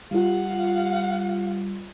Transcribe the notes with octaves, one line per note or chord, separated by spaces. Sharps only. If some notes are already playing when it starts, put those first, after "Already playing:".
G3 F4 F5 F#5